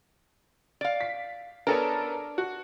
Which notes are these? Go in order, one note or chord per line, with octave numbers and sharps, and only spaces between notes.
D5 F5
B6
B3 D4 A4 A#4 C#5
F#4